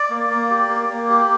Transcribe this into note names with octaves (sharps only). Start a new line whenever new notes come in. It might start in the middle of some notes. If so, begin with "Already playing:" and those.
Already playing: D5
A#3
A#3
G4
A#3
A#3
G4